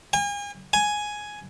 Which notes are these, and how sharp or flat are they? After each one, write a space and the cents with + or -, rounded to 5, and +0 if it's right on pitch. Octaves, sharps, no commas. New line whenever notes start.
G#5 -40
G#5 +5